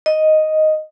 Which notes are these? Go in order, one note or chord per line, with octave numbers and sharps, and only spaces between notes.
D#5